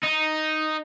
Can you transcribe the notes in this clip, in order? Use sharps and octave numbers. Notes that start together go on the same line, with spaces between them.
D#4